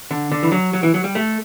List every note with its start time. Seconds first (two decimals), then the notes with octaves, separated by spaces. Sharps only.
0.11 D3
0.31 D3
0.43 E3
0.52 F#3
0.73 F#3
0.83 E3
0.94 F#3
1.04 G3
1.15 A3